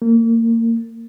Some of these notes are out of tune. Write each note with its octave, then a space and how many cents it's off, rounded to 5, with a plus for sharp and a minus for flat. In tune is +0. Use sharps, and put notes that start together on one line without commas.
A#3 -30